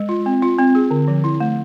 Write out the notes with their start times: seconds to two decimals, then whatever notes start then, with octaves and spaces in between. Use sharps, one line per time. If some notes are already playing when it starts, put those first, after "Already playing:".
Already playing: G#3
0.09 F4
0.26 C4
0.42 F4
0.59 C4
0.75 G#4
0.91 D3
1.08 F3
1.24 E4
1.40 A3